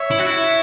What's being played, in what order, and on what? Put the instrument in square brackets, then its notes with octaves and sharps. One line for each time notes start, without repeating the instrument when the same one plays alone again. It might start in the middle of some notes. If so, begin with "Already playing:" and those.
Already playing: [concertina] C#5 E5
[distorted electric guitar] E4
F#4
E4